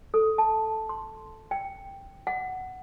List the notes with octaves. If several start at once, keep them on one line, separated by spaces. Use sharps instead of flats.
A4
A5
C6
G5
F#5